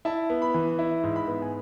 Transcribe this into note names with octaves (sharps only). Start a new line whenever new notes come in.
E4 A5
B3
B5
E3
E4
G#2
B5
B3
G#5